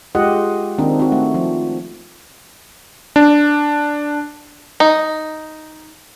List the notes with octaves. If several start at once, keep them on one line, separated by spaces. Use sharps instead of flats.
G#3 F4 G4 D#5 F#5
D#3 A#3 C4 D4 D#4
C4 F#4
A3
F3
D4
D#4